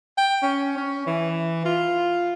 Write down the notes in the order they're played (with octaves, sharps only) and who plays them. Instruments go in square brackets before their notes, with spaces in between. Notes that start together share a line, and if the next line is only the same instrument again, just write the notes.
[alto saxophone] G5
C#4
C#4
E3
F4